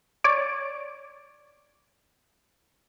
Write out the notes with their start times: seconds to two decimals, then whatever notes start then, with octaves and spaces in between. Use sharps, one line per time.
0.24 C#5 D5